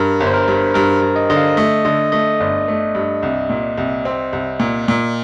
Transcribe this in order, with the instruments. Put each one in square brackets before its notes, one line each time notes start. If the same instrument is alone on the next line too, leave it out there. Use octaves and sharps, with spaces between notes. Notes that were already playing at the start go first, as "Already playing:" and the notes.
Already playing: [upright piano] G2 [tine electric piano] A#4
[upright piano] G1
[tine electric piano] C5
A#4
[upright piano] G2
[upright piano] G2 [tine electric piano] A#4
[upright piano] G2
[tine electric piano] D#5
[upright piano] D3 [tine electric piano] D#5
[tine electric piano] F5
[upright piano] A3 [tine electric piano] D#5
[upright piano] D3 [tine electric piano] D#5
[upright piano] A3 [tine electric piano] D#5
[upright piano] G1 [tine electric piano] D5
[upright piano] A3
G2
C2
A#2
C2
C4
C2
A#2
A#2